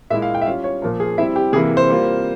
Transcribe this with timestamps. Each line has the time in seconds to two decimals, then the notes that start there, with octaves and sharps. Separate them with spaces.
0.10 A#2 G#3 E4 E5
0.22 F5
0.35 G5
0.42 E5
0.46 G3 C#4 F4 F5
0.64 C#5
0.82 A#2 F3 A#3 F4 A#4
1.00 G#4
1.18 G3 C4 E4 E5
1.36 G4
1.53 C3 E3 A#3 E4 G#4
1.77 C5
1.89 G3 A#3 F4